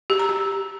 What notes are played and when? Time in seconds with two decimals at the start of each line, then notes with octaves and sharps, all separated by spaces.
0.10 G4
0.19 A#5
0.29 G4